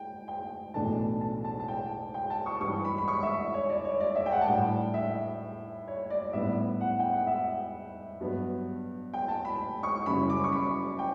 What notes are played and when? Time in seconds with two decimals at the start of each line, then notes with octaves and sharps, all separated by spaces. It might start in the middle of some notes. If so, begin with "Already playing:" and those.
Already playing: G5
0.28 G5
0.74 B1 A2 E3 A3 D4 A5
1.21 A5
1.44 A5
1.60 A5
1.68 G5
2.14 G5
2.30 A5
2.46 C#6
2.60 G2 E3 G3 D4 C#6
2.85 B5
2.98 B5
3.08 C#6
3.23 E5
3.54 C#5
3.70 D5
3.85 C#5
4.00 D5
4.16 E5
4.26 G5
4.32 F#5
4.41 A5
4.47 A2 G3 D4 G5
4.94 E5
5.88 C#5
6.10 D5
6.33 A2 G3 B3 D4 E5
6.81 F#5
6.99 G5
7.13 F#5
7.27 E5
8.20 G2 F#3 B3 D4
9.14 G5
9.28 A5
9.45 B5
9.83 C#6
10.06 F#2 C#3 G3 C#4 E4 B5
10.30 D6
10.44 C#6
10.52 B5
10.99 G5